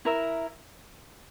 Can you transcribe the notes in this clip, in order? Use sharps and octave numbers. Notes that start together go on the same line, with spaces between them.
E4 A#4 E5